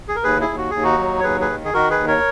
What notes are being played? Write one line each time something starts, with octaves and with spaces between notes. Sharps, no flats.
G#4
A#4
D#2 G#4 B4
E4 G#4
D#2
F#4
D#2 G#4
D#4 F#4
F#3
C#5
D#2 G#4 B4
G#4 B4
D#3
G#4
D#3 F#4 A#4
G#4 B4
D#2
A#4 C#5